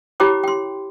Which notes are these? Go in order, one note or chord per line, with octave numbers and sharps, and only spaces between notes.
E4 G4 C#5 G5 B5 D6
G5 C6